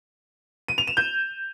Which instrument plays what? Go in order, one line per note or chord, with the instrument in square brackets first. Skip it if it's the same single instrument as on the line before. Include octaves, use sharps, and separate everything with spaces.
[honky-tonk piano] D#7
F7
E7
G6